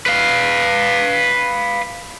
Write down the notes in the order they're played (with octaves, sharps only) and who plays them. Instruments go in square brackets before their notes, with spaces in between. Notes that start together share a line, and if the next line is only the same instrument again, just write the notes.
[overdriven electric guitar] B4 F5